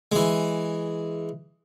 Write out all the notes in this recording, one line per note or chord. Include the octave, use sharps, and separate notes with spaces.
E3 G#3